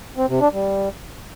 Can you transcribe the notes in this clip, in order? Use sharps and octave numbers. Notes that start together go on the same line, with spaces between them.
C4
C3
D4
G3